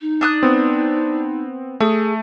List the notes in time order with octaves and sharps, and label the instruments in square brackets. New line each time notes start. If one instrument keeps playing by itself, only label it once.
[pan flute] D#4
[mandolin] D4 D#6 F#6
[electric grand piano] B3 C4
[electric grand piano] A3 [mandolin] G#4